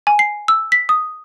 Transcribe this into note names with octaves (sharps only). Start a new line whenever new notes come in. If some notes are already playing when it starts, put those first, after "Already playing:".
G#5
C7
E6
B6
D#6